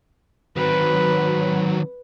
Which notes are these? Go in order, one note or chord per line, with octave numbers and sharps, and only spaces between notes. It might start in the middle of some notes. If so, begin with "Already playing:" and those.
D#3 F#3 C4 B4